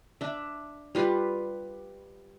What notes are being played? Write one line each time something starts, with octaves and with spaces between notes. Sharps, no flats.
D4 E5
G3 F4 B4